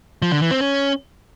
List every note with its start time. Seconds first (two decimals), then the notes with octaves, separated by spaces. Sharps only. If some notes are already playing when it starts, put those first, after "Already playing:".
0.22 F3
0.32 D3
0.41 E3
0.51 C4
0.60 C#4